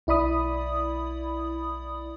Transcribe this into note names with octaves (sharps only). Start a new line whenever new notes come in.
B1 E4 D5 B5 D#6